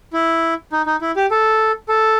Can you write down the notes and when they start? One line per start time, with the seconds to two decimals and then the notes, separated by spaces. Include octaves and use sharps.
0.13 E4
0.72 D#4
0.86 D#4
1.01 E4
1.16 G4
1.31 A4
1.89 A4